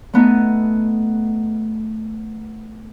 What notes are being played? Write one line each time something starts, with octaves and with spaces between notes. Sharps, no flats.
A3 B3 D#4